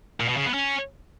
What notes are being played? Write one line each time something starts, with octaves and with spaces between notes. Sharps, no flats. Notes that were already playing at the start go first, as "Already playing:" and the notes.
A#2
B2
C#3
B3
C#4